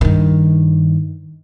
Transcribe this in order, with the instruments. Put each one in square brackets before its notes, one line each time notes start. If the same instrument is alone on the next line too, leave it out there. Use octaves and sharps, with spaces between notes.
[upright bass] G2 D#3